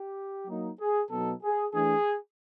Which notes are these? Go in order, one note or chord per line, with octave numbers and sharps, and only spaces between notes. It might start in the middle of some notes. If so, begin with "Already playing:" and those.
Already playing: G4
F#3 A#3 D#4
G#4
B2 F#3 B3 D#4 A4
G#4
E3 A3 D4 G#4